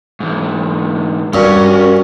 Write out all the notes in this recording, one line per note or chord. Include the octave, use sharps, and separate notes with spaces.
G#2 E3
G2 C#4 F#4 A#4